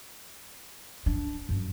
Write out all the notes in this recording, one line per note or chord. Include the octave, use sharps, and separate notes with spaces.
D4
F#2